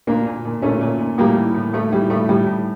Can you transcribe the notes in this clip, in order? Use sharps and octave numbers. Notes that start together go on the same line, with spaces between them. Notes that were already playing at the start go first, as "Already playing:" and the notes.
A#2 A#3 D4
A#2
A#2
A#2 A3 C#4
A#2
A#2
A2 G3 A#3
E3
A2
A2 A3
E3 G3
A2 A3
A2 G3
A2